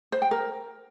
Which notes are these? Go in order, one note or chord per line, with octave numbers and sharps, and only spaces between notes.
C5
G5
A#4